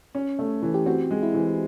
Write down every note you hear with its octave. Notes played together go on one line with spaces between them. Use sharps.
C#4
A3
E3
G4
C4 F#4
G#3
E4
E3